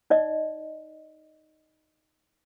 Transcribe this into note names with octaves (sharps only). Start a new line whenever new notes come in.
D#4 D5 D#5